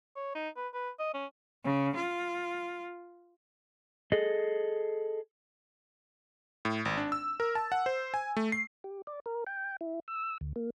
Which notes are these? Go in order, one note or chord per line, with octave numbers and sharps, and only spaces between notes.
C#5
D#4
B4
B4
D#5
C#4
C#3
F4
G#4 A4 D#5
A2
G#1
D4
E6
A#4
A5
F#5
C5
G#5
A3
C7
G4
D5
A#4
G5
E4
E6
D2
A#3